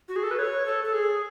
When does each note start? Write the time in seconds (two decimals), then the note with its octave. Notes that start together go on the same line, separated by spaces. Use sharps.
0.09 F#4
0.16 G#4
0.23 A4
0.31 B4
0.39 C#5
0.66 A4
0.84 A4
0.93 G#4